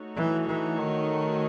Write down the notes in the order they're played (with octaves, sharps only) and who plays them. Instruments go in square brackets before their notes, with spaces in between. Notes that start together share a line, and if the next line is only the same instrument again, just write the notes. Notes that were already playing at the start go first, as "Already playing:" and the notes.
Already playing: [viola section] A3 D#4 F#4 A4 C#5
[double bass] E3
E3
D#3